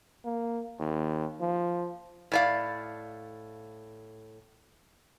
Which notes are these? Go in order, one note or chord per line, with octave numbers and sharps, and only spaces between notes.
A#3
D#2
F3
A2 D5 F5